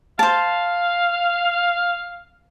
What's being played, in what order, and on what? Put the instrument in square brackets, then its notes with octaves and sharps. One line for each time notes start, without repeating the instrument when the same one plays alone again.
[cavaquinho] C5 A5 [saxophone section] F5